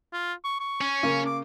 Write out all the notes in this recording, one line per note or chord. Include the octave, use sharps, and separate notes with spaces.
F4
C#6
C#6
C#4
C#3 A#3
D6